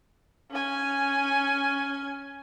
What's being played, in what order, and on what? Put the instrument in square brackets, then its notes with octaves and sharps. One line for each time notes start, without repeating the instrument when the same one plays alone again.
[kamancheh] C#4 G#5